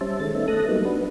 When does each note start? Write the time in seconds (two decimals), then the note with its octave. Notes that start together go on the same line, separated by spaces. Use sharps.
0.01 G3 C#4 C5 E5 A5
0.20 D#3 G#3 A4 A6
0.35 A3 B3 C#4 D#4 E5
0.48 A3 A4 A5 D#6 F#6 A#6
0.69 F#3 G3 A#3 B3 D#4
0.85 D4 F#4 B4